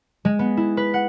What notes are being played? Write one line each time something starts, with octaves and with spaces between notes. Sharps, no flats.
G#3
B3
E4
B4
F#5